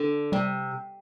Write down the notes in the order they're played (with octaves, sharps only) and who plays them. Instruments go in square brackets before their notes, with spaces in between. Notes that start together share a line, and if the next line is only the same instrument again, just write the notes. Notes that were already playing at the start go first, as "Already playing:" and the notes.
Already playing: [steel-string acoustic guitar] D3 [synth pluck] D4
[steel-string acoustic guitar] C3 [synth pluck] G3